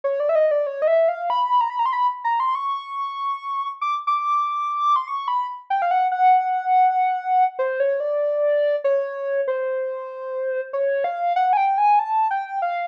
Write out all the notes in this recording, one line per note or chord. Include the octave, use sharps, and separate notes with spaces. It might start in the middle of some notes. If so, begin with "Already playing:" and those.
C#5
D5
E5
D#5
D5
C#5
D#5
E5
F5
B5
A#5
B5
A#5
C6
B5
A#5
C6
C#6
D6
D6
C6
C#6
B5
G5
F5
F#5
F#5
C5
C#5
D5
C#5
C5
C#5
F5
F#5
G#5
G5
G#5
A5
G5
F5